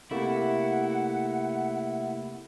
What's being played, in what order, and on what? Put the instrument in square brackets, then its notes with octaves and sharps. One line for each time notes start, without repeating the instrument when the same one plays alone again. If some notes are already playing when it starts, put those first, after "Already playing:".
[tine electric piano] C3 A3 A#3 [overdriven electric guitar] E4 [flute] F#5